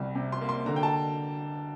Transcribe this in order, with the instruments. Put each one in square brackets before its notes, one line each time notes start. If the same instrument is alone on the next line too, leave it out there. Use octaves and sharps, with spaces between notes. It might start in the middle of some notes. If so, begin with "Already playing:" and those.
Already playing: [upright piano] C2 G3
C3
C6
A#3
C6
D3 A#5
G5
A5